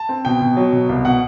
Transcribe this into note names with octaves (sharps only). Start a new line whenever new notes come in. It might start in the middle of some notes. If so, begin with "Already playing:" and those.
Already playing: A5
C4
B2 G5
B2
F#3
B2
C2
B2 F#5